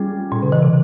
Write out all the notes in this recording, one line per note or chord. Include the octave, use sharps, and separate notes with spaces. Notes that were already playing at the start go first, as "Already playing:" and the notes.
Already playing: G3 C#4 F4 G#4
A#2
C#3
E3
C3